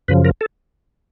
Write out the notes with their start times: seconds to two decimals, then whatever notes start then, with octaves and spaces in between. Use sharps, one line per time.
0.08 F#2 C#3 F3 B4
0.25 A#4
0.41 A4